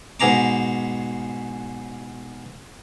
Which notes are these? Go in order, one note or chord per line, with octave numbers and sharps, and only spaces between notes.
G#2 B2 G#4 A#5 D6